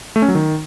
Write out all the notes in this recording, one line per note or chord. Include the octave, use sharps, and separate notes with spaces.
A3
C#4
F#3
D#3